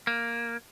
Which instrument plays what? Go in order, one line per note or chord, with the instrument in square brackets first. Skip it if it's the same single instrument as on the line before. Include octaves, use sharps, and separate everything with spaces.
[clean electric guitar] A#3